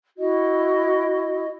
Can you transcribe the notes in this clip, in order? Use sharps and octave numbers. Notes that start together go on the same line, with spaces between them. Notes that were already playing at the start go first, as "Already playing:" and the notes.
E4 F#4 D#5